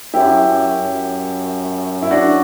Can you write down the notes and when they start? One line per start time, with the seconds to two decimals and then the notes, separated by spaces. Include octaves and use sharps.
0.14 F#2 E4 G4
0.46 F#2
0.79 F#2
2.02 E4
2.11 D4 F#4